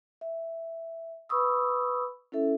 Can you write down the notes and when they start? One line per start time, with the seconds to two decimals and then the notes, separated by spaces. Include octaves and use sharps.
0.21 E5
1.29 B4 B5 C#6 D#6 E6
2.32 C#4 E4 A4 E5